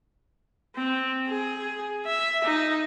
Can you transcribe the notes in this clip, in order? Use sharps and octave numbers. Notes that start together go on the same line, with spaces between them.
C4
G#4
E5
D#4